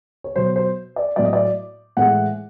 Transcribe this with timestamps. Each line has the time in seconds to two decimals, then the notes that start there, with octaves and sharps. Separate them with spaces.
0.24 C#5
0.36 B2 F#3 C5
0.56 C5
0.96 D5
1.16 A2 F#3 D5
1.25 D#5
1.33 D5
1.97 A2 E3 G#3 F#5